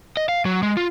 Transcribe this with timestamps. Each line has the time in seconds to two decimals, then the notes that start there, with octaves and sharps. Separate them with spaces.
0.17 D#5
0.29 F5
0.45 F#3
0.63 G#3
0.77 F4